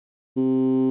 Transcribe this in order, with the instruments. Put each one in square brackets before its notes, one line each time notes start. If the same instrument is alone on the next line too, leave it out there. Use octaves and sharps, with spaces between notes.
[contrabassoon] C3